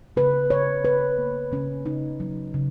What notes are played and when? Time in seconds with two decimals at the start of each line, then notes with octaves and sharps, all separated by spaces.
0.16 C#3 B4
0.50 C#3 C#5
0.85 C#3 B4
1.18 A#3
1.52 C#3 C#4
1.86 C#3 D#4
2.20 F#3
2.54 C#3